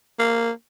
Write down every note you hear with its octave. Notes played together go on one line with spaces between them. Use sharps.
A#3